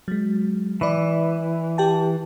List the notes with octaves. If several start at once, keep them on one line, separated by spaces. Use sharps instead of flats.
F#3 G#3
E3 D5 B5
G4 G5 A5